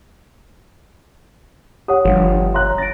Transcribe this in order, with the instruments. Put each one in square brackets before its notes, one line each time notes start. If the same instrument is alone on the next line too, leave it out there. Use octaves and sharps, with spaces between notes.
[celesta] G4 C#5 F#5 [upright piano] D#6
[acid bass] G1 [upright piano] G2 F3
[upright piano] C#5 A#5 F#6 [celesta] C6
[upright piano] A6 [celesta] A#6 D7